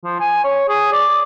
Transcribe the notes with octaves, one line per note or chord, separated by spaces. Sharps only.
F3
G#5
C#5
G#4
D5